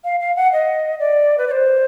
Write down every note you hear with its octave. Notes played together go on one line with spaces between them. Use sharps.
F5
F5
F#5
D#5
D5
B4
D5
C5